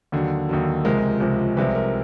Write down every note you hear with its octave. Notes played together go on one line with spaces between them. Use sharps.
D#2 D3 F#3
D#2 D3 F#3
C#2 C3 F3 G#3 A#4
C#2 C3 F3 G#3
C2 C3 F3 G#3 B4
A#4